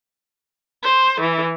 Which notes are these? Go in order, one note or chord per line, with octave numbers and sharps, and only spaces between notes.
C5
E3